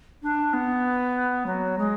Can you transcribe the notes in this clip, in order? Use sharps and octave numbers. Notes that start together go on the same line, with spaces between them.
D4
B3
F#3
G#3